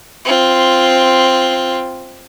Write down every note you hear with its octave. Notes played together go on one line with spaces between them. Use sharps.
C4 F4